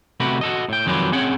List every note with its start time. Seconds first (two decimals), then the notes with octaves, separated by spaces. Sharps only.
0.20 C3 A3 F#4 G4 B4
0.41 F#4 A4 D#5
0.69 A2 G5
0.86 F2 D#3 F#3 G#3 G4 B4
1.12 C4 C#4 G#4 C#5 F#5 G5